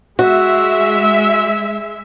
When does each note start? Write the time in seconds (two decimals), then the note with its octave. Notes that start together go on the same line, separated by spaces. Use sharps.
0.19 G#3 F#4 E5